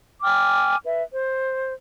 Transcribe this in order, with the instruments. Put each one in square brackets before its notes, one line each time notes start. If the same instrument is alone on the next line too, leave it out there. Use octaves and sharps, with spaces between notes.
[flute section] G5 G#5 D6 F6
B4 E5
C5